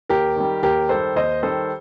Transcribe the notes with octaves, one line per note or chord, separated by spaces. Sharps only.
D#2 G4 A#4
D#3 G3
D#2 G4 A#4
D#3 G3 A4 C5
D#2 C5 D#5
D#3 G3 A4 C5